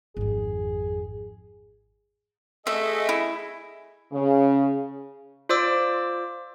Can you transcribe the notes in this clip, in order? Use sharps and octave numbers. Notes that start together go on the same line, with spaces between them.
G#1 F2 G#4
A3 G#4 D#5 E5
E4
C#3
F4 C5 D5 D6 E6